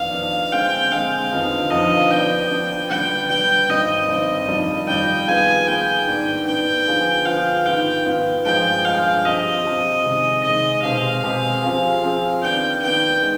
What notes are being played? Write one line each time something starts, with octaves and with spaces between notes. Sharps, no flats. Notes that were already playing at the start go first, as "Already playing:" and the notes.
Already playing: F2 D#3 B3 D4 F5
F2 D#3 B3 D4
D3 G#3 C4 G5
D3 G#3 C4 F5
F2 D3 F3 B3 D#4
F2 D3 F3 B3 D#4 D#5
F3 B3 D4 G5
F3 B3 D4
D3 G3 B3 G5
D3 G3 B3 G5
G2 D#3 G3 C4 D#5
G2 D#3 G3 C4
F2 D#3 G3
F2 D#3 G3 G5
D#3 B3 F4 G#4 G#5
D#3 B3 F4 G#4 G5
G#2 D#3 B3 D4
G#2 D#3 B3 D4 G5
D3 F3 B3 F4 G#4
D3 F3 B3 F4 G#4 F5
G#2 D#3 B3 F4 G5
G#2 D#3 B3 F4
G2 F3 G#3 G5
G2 F3 G#3 F5
F3 C4 G4 D#5
F3 C4 G4
C3 D#3 G#3
C3 D#3 G#3 D#5
B2 G#3 C4 G4 F5
B2 G#3 C4 G4
F3 C4 F4 G#4
F3 C4 F4 G#4
D#3 B3 D4 G5
D#3 B3 D4 G5
D#3 G#3 B3